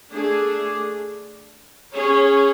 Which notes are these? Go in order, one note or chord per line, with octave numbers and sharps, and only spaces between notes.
A3 D4 G#4
C#4 G#4 C#5